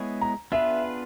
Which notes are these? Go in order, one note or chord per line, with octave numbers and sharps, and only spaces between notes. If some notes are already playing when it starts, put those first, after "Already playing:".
Already playing: G#3 B3 E4 G#4 C#5
A#5
B3 D4 F4 G#4 B4 E5